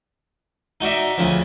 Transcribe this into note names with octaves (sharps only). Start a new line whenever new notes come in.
D#4 F#4 D5 E5
D2 C#3 F3